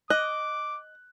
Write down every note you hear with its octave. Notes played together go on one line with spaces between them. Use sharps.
D#5 D6 F#6